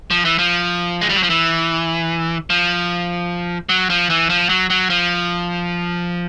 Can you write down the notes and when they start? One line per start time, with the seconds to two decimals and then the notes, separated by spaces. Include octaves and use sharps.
0.11 F3
0.25 E3
0.38 F3
1.01 G#3
1.09 G3
1.16 F#3
1.23 F3
1.30 E3
2.50 F3
3.69 F#3
3.90 F3
4.10 E3
4.30 F3
4.49 F#3
4.70 F#3
4.90 F3